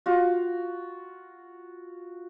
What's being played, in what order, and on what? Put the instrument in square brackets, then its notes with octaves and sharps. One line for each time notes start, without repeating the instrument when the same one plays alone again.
[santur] F4 F#4